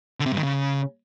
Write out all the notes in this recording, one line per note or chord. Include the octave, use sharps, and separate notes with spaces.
D3
C3
G2
D#3
C#3